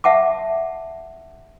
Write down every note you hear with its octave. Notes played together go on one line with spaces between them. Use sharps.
E5 F#5 A5 D6